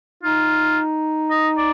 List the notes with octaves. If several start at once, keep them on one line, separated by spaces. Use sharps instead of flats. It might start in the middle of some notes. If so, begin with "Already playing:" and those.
D#4 F4
D#5
D5